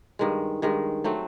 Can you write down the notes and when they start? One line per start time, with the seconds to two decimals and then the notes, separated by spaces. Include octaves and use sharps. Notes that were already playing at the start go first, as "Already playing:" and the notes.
0.19 G2 D#3 G#3
0.62 G2 D#3 G#3
1.04 F#3 A3 C4